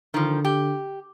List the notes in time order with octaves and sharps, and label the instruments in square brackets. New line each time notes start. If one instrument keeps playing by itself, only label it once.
[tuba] D3 [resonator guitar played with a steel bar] D#3 F3
[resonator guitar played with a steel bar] G4